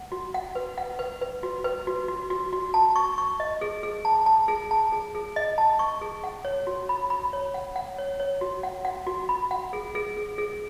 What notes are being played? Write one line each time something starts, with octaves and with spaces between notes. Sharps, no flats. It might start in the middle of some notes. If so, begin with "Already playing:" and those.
Already playing: F#5
F#4
F#5
B4
F#5
B4
B4
F#4
B4
F#4
F#4
F#4
F#4
A5
C#6
C#6
D#5
G#4
G#4
A5
A5
G#4
A5
G#4
G#4
D#5
A5
C#6
G#4
F#5
C#5
F#4
B5
B5
C#5
F#5
F#5
C#5
C#5
F#4
F#5
F#5
F#4
B5
F#5
G#4
G#4
G#4
G#4